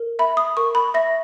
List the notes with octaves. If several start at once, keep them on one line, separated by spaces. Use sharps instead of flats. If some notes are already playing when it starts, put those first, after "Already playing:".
Already playing: A#4
E5 B5
D#6
A#4 C#6
B5
E5 A#6